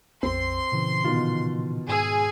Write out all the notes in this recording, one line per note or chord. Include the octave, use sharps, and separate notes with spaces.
A#1 F2 C4 C6
A#2 C#3 E3
B2 D#3 F4
G#2 G#4 E6